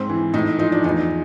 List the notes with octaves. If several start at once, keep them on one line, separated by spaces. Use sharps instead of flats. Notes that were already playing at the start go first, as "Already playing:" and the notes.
Already playing: G#2 C4
E3
A2 D#4
F3 D#4
D4
E2 D#4